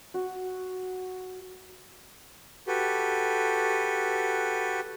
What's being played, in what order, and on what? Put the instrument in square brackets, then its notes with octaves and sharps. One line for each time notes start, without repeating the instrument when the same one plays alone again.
[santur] F#4
[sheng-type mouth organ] F#4 G4 A4 B4